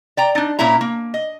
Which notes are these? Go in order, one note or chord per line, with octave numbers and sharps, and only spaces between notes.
D5 G5 A#5
D4 D#4
A#2 A#3 C#4 E4 A#5
A#3
D#5